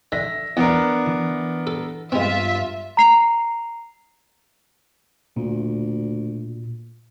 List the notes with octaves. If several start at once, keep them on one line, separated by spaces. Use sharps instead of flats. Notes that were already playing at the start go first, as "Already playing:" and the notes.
D3 E5 A#6
E2 B3 D4 A#4
E3
A4
G2 G#3 B3 C4 F4 E5 F6
A#5 C7 F7
D2 A#2